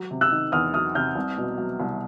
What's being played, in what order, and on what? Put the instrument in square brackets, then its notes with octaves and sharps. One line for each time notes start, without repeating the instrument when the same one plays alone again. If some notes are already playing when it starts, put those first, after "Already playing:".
Already playing: [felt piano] F#3
C3
[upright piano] E6 F#6
[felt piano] D#3
[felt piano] E2 [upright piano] D#6 F6
[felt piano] F#3 [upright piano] D#6 F6
[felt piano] C3 [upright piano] F6 G6
[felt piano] C2
B2
F#3
C2